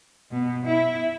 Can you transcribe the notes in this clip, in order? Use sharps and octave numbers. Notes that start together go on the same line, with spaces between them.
B2
E4